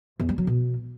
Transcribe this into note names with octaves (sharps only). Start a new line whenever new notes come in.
E2
G3
F#3
B2